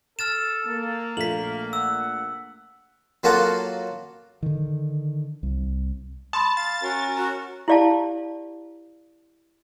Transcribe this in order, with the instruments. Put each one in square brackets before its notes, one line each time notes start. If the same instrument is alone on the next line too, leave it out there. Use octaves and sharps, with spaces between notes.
[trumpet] A4 [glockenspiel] F6 A6 E7
[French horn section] A#3
[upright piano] A#1 A3 [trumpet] F5 [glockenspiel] B6 F#7
[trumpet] F#5 [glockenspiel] E6
[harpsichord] F#3 A#3 F4 F#4 A4
[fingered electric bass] D3 D#3
C2
[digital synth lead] A5 [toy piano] B5 C6 D#6
[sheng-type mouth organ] F5 [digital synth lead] A6
[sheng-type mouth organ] C#4 A#4 [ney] F#4
[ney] F#4 [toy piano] A#5
[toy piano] E4 G4 D5 F5 A5